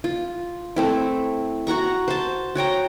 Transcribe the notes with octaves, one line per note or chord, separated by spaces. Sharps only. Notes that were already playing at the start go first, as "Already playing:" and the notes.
F4
A3 C4 E4
F#4 F#5 A#5 C#6
C5 A5
F#4 C#5 G5 A#5